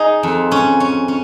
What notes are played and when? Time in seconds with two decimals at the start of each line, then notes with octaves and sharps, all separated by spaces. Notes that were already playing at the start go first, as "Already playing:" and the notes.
Already playing: D#4 G#4
0.23 F2
0.52 C#4
0.80 C#4
1.08 C#4